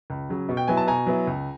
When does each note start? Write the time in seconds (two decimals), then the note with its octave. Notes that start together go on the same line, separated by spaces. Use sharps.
0.10 C#2
0.29 C#3 F#3
0.49 B2
0.57 G5
0.68 F#3 B3 E4 G#5
0.77 A5
0.87 B2 G#5 A#5
1.06 F#3 B3 E4
1.27 C#2